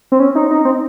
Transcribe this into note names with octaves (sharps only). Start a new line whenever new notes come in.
C4
C#4
D#4
D#4
C4